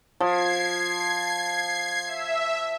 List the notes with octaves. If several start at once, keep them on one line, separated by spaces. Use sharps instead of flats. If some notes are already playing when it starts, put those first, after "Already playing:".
F3 G#6 C7
E5